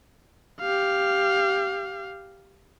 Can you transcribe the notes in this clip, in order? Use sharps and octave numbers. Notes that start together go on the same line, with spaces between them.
G4 F5